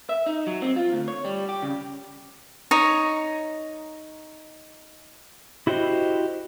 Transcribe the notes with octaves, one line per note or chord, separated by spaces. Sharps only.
E5
D#4
F#3
C4
F4
D2
C#5
G3
G4
C#3
D#4 C#5 A#5
E4 F#4 G4 C5 D#5